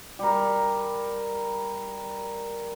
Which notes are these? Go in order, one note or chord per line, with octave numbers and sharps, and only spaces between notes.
G3 A#4